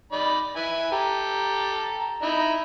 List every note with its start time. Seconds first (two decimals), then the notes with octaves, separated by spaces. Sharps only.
0.12 D#4 D5 B5
0.56 E4 B4 G#5
0.92 G4 A4 A#5
2.22 D#4 E4 B5